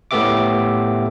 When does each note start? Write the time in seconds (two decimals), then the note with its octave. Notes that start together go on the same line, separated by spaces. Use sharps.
0.11 A2 A3 B3 G4 E5 D6